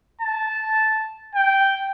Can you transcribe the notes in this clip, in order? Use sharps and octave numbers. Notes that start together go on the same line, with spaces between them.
A5
G5